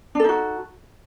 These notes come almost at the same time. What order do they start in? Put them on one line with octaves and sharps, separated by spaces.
D4 A4 D#4 F#4